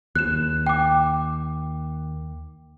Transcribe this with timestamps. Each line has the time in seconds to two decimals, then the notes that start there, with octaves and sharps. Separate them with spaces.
0.16 D#2 F#6 E7
0.67 G5 D6